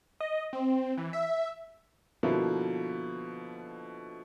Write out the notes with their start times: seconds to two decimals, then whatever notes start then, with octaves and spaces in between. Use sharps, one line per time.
0.21 D#5
0.53 C4
0.98 E3
1.13 E5
2.23 B2 D3 F3 A#3 E4